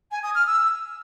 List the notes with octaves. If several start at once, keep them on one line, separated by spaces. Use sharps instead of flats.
G#5
D#6
F6
E6